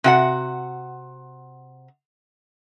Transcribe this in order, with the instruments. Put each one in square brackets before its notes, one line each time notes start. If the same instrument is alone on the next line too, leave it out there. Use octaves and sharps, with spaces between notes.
[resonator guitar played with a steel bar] C3 F#4 F#5